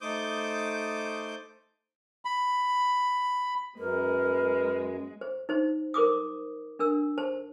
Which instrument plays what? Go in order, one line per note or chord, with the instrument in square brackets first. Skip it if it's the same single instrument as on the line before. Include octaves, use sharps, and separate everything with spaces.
[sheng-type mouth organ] A3 D#4 C5 D6 D#6 G6
[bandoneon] B5
[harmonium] F#2 [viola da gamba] G#3 [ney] A#4 [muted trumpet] B4
[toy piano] C5
D#4 C5
A#4 C5 D6 D#6
D4 A#4 E6
C5 A5